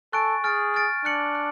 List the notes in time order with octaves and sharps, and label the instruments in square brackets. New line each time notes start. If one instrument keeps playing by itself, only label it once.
[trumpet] A4 [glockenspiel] G#5 C#6 F#6 A6 D7
[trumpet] G#4 [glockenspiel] F6 A6 D7
[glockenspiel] F6 A6 D7
[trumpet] D4 [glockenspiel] F#6 C#7 F#7
[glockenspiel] F#6